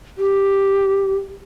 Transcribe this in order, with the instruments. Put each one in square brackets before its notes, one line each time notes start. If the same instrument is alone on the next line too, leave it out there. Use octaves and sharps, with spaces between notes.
[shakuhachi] G4